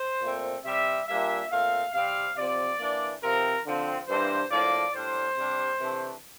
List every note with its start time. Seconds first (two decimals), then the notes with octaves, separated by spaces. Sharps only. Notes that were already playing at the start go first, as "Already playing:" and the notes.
Already playing: C5
0.22 A#2 A3 C4
0.65 C3 G3 C4 E5
1.08 A#2 G3 A#3 D4 E5
1.51 A#2 A3 C4 F5
1.94 C3 G3 C4 F5
2.36 C3 F3 C4 D5
2.79 E3 A#3 D4
3.22 C3 F3 C4 A#4
3.66 D3 F3 C4
4.07 G2 E3 A#3 D4 C5
4.51 A2 F3 A#3 D4 D5
4.94 A2 G3 D4 C5
5.36 C3 G3 D4
5.80 C3 E3 A3 D4